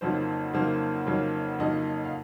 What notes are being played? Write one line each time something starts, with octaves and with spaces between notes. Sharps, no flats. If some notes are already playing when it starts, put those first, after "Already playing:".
F2 C#3 F#3 A#3 D#4 C5
F2 C#3 F#3 A#3 D#4 C5
F2 C#3 F#3 A#3 D#4
F2 C#3 F#3 A#3 D#4 D#5
F5